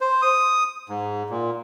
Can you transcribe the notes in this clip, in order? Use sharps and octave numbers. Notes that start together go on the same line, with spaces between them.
C5
D#6
G#2
A#2